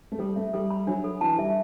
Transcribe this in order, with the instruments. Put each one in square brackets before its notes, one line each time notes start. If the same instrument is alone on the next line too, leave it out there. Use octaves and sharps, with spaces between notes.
[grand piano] A3
[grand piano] G3 [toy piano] A4
[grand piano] A3 [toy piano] E5
[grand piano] G3 [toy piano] A4
[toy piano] B5
[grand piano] F#3 [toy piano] D4
[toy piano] A4
[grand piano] E3 [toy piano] A5
[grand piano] G3 [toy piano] E5